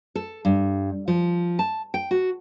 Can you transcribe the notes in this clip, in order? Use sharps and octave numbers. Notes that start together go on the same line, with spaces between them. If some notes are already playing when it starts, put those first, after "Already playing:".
A4
G2
F3
A5
G5
F#4